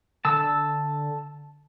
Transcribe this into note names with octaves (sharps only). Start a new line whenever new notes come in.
D3 A5 E6